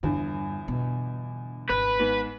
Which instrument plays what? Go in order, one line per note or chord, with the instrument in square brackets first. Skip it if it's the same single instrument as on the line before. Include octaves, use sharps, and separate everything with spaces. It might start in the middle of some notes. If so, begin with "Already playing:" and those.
[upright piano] G1 E2 D3 [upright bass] G2
[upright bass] B2
[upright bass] G#1 [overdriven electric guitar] B4
[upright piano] G#2 B3